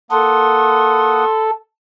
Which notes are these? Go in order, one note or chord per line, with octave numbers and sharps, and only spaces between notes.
A#3 A4 F#5 C6 D#6